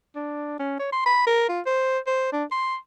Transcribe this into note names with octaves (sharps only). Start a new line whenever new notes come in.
D4
C#4
C#5
C6
B5
A#4
F4
C5
C5
D4
C6